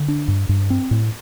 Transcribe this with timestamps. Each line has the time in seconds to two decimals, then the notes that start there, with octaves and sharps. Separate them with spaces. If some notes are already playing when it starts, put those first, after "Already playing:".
Already playing: D3
0.08 D4
0.28 G2
0.49 G2
0.70 C4
0.91 A2